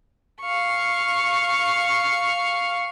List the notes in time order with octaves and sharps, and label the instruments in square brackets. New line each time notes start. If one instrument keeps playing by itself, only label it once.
[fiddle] F5 C#6